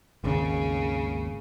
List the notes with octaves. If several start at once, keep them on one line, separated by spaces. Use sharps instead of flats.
G#1 D#2 C#3